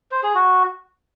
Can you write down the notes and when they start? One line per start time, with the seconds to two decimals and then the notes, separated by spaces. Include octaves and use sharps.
0.11 C5
0.23 G#4
0.35 F#4